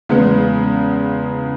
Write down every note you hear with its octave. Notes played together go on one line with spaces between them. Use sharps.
E2 C#3 G#3 B3